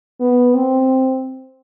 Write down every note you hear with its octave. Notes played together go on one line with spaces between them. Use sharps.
B3
C4